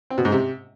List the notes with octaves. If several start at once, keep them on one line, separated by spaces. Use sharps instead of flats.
C4
B2
G#2
C3